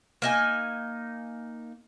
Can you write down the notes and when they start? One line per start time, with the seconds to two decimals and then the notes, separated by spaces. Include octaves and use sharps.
0.22 A#3 D#4 G#5